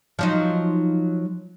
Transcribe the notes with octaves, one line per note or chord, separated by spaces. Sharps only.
F3 F#3 D#4